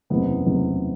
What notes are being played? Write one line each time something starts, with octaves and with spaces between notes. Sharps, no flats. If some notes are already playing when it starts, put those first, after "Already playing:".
F#1 E2 C3 B3
F#1 E2 C3